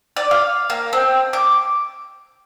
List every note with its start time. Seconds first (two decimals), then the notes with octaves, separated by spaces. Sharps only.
0.17 D5
0.31 F5
0.70 A#3
0.93 C4
1.33 D6